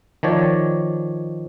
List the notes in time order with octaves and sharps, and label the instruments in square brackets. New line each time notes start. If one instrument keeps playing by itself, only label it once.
[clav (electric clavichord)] D#3 F3 C#5 D5